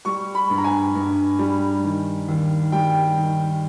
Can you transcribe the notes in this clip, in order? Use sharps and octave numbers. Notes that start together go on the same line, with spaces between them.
G3 C#6
B5
G2
A#5
G#5
G2
G3
D#3
D#2
G3 G5
D#3